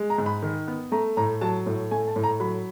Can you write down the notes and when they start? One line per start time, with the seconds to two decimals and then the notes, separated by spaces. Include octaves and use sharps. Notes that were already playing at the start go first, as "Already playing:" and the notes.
Already playing: G#3
0.10 A#5
0.18 G#2
0.26 B5
0.42 D#3
0.67 B3
0.92 A3 A#5
1.17 A2 A#5
1.41 F#3 A5
1.66 A2
1.91 A3 G#5
2.07 A5
2.16 A2
2.23 A#5
2.40 F#3 B5